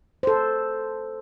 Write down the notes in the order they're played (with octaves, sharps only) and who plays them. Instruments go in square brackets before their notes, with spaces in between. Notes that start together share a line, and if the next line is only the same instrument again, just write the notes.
[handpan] A4 C5